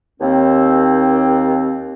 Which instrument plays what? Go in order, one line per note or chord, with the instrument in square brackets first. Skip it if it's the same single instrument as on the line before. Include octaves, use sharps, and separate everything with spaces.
[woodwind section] D#2 C4